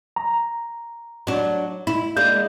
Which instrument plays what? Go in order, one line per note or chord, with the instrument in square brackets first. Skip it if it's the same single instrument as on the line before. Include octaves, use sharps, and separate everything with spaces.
[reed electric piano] A#5
[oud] F#3 D4
E4
[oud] G#3 A#3 D4 [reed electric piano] G6